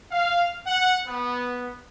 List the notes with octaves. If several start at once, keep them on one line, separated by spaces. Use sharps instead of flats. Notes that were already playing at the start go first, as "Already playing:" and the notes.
F5
F#5
B3